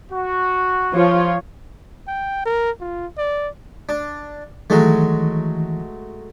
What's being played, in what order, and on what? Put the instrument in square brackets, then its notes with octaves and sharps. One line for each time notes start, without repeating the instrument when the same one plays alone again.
[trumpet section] F#4
[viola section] F3 F4 C#5
[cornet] G5
A#4
F4
D5
[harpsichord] D4
[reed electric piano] D#3 E3 [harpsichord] F#3 G#3 A3